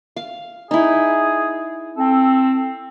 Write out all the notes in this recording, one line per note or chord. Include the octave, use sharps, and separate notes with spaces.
F5
D#4 E4 G#4
C4 A4